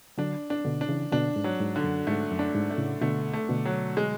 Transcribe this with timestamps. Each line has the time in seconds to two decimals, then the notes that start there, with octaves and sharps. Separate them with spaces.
0.18 D3 F#3 D4
0.50 D4
0.65 B2 D3
0.81 D4
0.89 C#3 E3
1.12 B2 D3 D4
1.36 G#2
1.44 F#3
1.60 G#2
1.76 D3
1.84 F#2
2.07 G#2 A3
2.31 F#2
2.39 D4
2.54 G#2
2.70 A3
2.78 A2 C#3
3.02 B2 D3 A3
3.33 A3
3.49 B2 D3
3.65 F#3
3.97 G#3